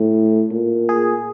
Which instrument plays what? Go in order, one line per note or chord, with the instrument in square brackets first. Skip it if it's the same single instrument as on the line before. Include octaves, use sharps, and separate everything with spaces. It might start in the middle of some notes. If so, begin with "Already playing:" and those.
Already playing: [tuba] A2
A#2
[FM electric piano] G#4